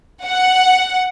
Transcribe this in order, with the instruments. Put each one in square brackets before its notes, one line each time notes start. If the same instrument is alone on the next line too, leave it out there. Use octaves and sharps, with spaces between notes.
[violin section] F#5